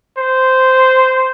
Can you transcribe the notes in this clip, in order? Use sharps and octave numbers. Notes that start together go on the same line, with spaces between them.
C5